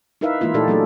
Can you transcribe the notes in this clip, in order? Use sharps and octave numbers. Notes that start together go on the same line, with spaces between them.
D#4 E4 A#4 B4 E5 F5
E3 G#3 A#3 E4 F4
A#2 A3 D#4 G4 A4 D5
F#3 A3 D4 G#4